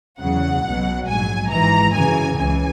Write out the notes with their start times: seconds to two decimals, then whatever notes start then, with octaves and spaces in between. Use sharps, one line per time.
0.20 E2 C#3 F#3 F#5
0.64 B1 B2 F#3
1.07 A#1 G#2 F#3 G#5
1.51 G#1 G#2 E3 A#5
1.94 F#2 C#3 E3 G#5
2.38 C#2 C#3 E3 G#5